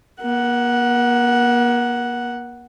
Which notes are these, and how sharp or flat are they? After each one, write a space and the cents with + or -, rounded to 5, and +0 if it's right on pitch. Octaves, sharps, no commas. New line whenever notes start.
A#3 +40 F#5 +0